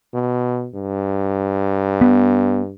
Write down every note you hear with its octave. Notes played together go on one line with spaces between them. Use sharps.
B2
G2
B3